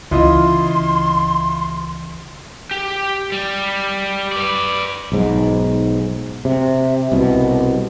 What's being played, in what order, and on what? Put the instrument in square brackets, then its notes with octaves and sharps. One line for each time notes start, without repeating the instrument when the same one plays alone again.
[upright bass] C#2 E3 [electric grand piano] E4 F4 D#5 [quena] C6
[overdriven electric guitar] G4
G3
B4 D5
[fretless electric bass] B1 G#2
C3
C2 B2